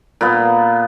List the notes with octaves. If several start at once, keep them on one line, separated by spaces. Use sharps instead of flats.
A#2 B3